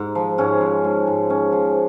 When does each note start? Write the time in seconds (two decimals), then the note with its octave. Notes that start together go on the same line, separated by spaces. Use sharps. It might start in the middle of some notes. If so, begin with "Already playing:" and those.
Already playing: G#2
0.15 F3
0.38 G#2 C#4
0.61 F3
0.84 G#2
1.07 G#2
1.30 G#2 C#4
1.52 F3